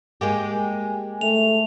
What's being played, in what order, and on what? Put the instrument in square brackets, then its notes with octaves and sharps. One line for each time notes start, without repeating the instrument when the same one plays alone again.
[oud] G#3 A#3 G4 [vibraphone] G5 G#5
[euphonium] A3 [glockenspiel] F7